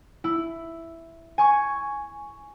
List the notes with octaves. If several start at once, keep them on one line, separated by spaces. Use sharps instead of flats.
E4
G#5 C#6